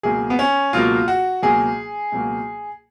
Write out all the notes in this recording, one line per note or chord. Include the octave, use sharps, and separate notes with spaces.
C#2 B2 F#3 A#3 G#4
B3
C#4
C#2 B2 F#3 A#3 F4
F#4
C#2 B2 F#3 A#3 G#4
C#2 B2 F#3 A#3